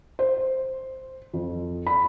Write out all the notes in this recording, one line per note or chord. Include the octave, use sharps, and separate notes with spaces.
C5
F2
B5